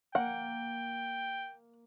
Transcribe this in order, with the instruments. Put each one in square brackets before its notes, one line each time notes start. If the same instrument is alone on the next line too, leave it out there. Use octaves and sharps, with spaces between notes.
[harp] A#3 [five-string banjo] F#5 [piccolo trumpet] G5